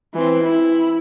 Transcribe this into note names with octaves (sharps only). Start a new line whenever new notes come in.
E3 C4
E4